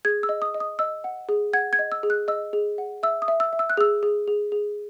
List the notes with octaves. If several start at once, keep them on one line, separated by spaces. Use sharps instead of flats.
G#4 G#6
E6
D#5
D#6
D#5
D#6
D#5 E6
F#5
G#4
F#5 G#6
G#6
D#5
E6
G#4
F#6
D#5 E6
G#4
F#5
E5 E6
D#6
E5
E6
E5
E6
F#6
G#4 E6
G#4
G#4
G#4